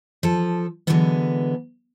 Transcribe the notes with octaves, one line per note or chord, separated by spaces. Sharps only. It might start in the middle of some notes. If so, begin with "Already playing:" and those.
F3 A4
D3 E3 F#3 G#3 A3 B3